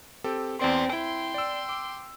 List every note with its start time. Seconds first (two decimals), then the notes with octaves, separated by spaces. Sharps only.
0.24 C4 G4 A4
0.59 E2 C4 D5 C6
0.93 E4 G5 C6
1.34 D5 E6
1.69 D6